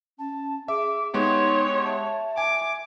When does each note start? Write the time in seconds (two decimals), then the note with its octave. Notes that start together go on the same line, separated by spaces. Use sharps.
0.19 C#4 A5
0.68 G#4 E5 D6
1.14 G#3 B3 D#4 G4 C#5 C6
1.84 E5 A5
2.37 G#5 D6